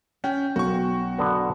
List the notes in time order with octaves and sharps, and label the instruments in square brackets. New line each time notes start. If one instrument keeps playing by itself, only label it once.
[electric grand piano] C#4 [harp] G5
[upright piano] B1 [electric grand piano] F#4 C#6
[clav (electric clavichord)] D3 B3